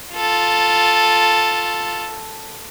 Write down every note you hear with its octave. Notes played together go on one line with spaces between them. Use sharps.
F4 A4